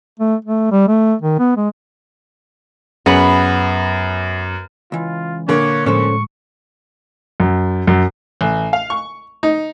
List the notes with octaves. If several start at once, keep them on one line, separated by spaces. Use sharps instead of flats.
A3
A3
G3
A3
D#3
B3
G#3
F#2 B3 C#4 G#4 B5
C#2 E3 F4
A#2 D3 A#3 C#5
A2 F3 G#3 C#4 A4 C5 C#6
F#2
F#2
A1
F5
C#6
D#4